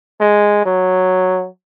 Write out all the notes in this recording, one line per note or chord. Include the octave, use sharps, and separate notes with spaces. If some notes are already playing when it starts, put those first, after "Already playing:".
G#3
F#3